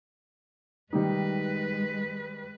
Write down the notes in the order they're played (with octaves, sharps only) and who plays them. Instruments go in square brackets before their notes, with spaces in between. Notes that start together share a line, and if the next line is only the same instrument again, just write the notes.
[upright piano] D#3 G3 D#4 [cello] G#3 B4